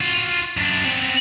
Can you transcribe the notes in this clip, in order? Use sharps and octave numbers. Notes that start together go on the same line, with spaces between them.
F4 F#4
F#2 D4
B3 C4